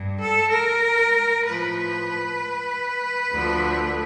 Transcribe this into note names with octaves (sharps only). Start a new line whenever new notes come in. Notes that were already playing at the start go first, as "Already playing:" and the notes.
Already playing: G2
A4
A#4
A2 F3 B4
D2 D3 F3